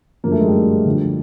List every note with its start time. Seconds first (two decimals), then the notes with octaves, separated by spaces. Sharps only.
0.24 F#2 D3 F3 A#3
0.32 A3
0.40 G#3
0.47 G3 A3
0.85 D2 D3 F3